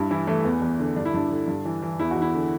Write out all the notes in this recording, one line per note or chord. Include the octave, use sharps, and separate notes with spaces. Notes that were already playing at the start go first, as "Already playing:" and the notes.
Already playing: G2 E4
E3 E4
E3 A3
E2 B3
E2
D3
G2 D4
E4
G2 D4
D3
G2
E3
E3
E2 E4
F#4
E2
E4
D3